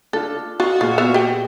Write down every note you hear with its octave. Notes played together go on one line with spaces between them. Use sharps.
D4 F4 A4
F4 F#4 D#5
A#2 F4 G#4 F6
B3 E5 F5
G4 G5